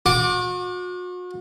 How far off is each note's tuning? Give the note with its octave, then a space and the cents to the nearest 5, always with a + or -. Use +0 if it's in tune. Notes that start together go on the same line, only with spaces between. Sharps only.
F#4 -40 D6 +0